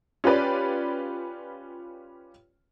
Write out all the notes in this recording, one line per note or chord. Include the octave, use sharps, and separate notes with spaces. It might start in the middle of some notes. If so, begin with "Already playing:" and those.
C#4 F4 G4 B4 D5